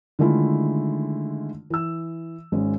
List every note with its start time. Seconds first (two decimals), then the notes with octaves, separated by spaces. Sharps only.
0.19 D3 D#3 G#3 A3 E4 F4
1.70 E3 E6
2.52 G#1 G#3 C#4